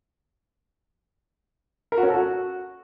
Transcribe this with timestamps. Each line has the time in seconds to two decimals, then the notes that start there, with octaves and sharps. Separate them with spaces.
1.92 A#4
1.98 F#4
2.03 C#4
2.09 A4
2.14 F#4